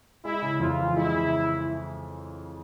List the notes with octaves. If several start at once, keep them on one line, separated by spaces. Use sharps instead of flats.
G#3 E4
C#3
F2 F4
E3
G#3 E4
C#3